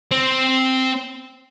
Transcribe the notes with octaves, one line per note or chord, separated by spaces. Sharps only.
C4